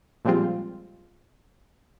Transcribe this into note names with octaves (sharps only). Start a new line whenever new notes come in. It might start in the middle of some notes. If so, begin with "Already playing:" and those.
A#2 F3 G3 G#3 C4 F4